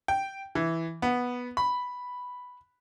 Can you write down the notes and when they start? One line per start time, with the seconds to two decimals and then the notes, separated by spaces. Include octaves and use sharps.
0.08 G5
0.55 E3
1.02 B3
1.57 B5